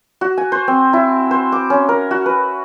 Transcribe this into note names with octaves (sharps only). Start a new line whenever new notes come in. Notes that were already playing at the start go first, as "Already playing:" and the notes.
F#4
G#5
C5
C4
E4
C5
D6
C#4
A#4
F#4
B4